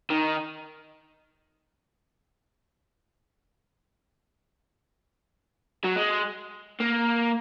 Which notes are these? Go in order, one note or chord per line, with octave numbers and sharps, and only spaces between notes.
D#3
F#3
G#3
A#3